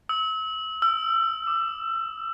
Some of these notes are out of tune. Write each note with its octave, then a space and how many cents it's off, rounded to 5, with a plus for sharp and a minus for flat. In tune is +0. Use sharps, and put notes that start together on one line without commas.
E6 -35
E6 +30
D6 +15